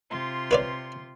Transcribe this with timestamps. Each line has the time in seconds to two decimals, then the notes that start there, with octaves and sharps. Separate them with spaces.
0.10 C3 F4 C6
0.51 B4 C#5 D5